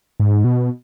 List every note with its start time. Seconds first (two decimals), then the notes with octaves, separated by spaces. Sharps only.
0.20 G#2
0.44 B2